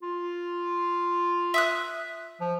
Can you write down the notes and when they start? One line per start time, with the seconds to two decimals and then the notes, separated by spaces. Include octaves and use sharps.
0.03 F4
1.54 E5 D#6 F#6
2.41 F3